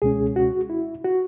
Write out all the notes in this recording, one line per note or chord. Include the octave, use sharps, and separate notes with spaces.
C#2 B2 G#3 C#4 G#4
F#4
E4
F#4